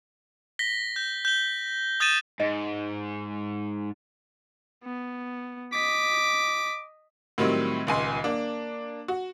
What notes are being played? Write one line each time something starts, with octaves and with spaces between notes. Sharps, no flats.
A#6 B6 G7
G6
G6 G7
D#6 G6 A6 A#6 D#7 E7
G#2 D#5
B3
D#5 D6 B6
A2 D#3 F#3 G3 C4
D#1 C#2 G#5 C6
A#3 D4
F#4